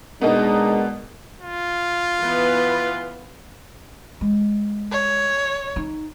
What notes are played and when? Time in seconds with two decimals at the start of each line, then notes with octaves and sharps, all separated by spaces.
0.21 B2 G#3 A#3 B3 D4 D#4
1.40 F4
2.21 E3 B3 B4
4.21 G#3
4.91 C#5
5.76 D#4